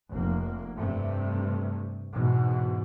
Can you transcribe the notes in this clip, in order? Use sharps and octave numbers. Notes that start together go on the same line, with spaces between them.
F1 A#3
G2 C3 A3
E2 G#2 B2